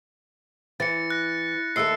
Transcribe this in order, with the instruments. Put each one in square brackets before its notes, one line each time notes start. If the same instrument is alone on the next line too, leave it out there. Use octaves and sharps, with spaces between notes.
[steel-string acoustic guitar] E3 [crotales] A6 C#7
[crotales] F#6 A#6
[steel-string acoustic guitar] D#2 A3 A4 [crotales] E6 C7